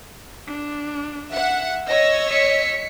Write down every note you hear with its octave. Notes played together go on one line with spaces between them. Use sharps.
D4
E5 F#5
C#5 D#5 E6 A#6
B6 C#7